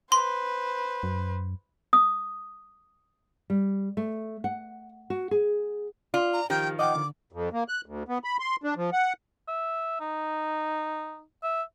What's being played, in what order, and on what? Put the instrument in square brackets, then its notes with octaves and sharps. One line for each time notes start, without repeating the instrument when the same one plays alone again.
[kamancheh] B4 C5 [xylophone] C6
[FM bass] F#2
[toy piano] D#6
[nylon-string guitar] G3
A3
F#5
F#4
G#4
[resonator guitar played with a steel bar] F4 [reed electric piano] D5
[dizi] A#5
[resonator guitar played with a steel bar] D#3 F3 [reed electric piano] G4 [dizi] G5
[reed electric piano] D#5 F#5 G5 [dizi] D6
[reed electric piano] D3
[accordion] F2
A#3
F#6
D2
B3
B5
C6
D4
F3
F#5
[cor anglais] E5
D#4
E5